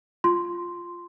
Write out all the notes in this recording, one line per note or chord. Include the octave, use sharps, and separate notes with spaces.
F4 C6